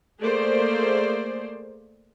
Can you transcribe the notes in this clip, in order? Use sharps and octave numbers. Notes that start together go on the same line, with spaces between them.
A3 A#3 G#4 C5 D5